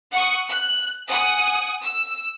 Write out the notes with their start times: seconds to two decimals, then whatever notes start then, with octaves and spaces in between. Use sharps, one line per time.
0.12 F#5 C#6 D#6
0.48 F#6
1.08 F#5 G#5 D#6
1.83 E6